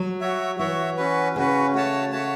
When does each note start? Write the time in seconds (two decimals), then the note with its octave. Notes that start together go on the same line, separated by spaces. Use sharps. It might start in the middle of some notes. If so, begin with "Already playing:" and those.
Already playing: F#3
0.21 F#4 C#5 E5
0.59 E3 F#4 C#5 E5
0.97 C#4 F#4 B4
1.36 C#3 C#4 F#4 B4
1.74 A3 F#4 C#5 A5
2.12 A3 F#4 C#5 A5